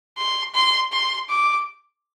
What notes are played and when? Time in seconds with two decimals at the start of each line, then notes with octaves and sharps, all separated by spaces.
0.18 C6
0.54 C6
0.92 C6
1.29 D6